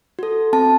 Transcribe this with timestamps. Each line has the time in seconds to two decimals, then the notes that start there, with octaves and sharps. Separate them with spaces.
0.19 F#4 A4
0.53 C4 A5